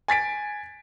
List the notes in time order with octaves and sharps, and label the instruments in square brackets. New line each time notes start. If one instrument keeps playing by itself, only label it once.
[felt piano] G#5 A6 B6 D7